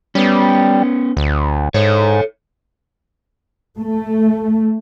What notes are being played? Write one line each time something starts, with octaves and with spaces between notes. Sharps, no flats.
G3 B3 C#4
D2
G#2 A4 C#5
A3